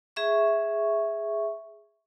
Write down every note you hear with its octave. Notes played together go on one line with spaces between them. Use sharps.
G#4 E5 C#6